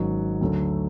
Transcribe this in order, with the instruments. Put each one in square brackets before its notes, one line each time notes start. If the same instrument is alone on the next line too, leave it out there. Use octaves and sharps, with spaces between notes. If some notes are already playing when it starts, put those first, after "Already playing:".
Already playing: [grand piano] G#1 G#2 F#3 C#4 F#4
D2 D3 F#3 A3